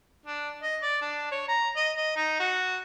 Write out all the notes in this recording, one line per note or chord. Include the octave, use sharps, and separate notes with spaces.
D4
D#5
D5
D4
C#5
A#5
D#5
D#5
D#4
F#4